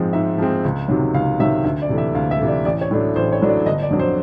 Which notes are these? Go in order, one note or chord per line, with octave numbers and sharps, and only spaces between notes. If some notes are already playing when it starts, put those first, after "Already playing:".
Already playing: G#2 F3 G#3 C4
G#2 E5
F3 G#3 C4
C#2
C3 D#3 F#3
C#2 F5
C3 D#3 F#3 E5
D2 E5
D5
C3 E3 A3
E5
D2 F5
E5
C3 E3 A3
D5
A1 D5
C#5
A2 F#3 A3 D4
A1 C5
C#5
A2 F#3 A3 D4
D5
G1 D#5
D5
F2 D3 F#3
C5